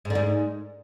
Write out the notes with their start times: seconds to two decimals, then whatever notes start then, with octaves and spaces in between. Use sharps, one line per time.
0.05 G#2
0.10 D3
0.15 G#2